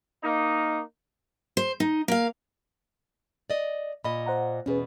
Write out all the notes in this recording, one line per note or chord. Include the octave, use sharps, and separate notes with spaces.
A#3 D#4
C5
D#4
A#3 F5
D5 D#5
A#2 D#5 B5
C5 F#5 A#5
E2 B2 C#4 G#4 B4